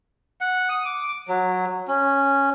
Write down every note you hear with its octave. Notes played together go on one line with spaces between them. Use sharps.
F#5
D#6
D6
F#3
C#4